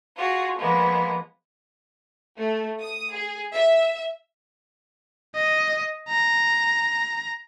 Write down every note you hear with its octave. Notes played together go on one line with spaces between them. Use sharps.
F4 F#4 G#4
F3 G#3 A#3 B3
A3
D#6
G#4
E5
D#5
A#5